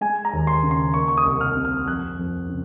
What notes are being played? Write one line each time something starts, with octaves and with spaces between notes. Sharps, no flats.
G#3 G#5
A#5
D#2
C6
C#3
C6
A#3 C#6
C#6
D#6
C2
F6
C3
F6
F2 F#6
F2
C#3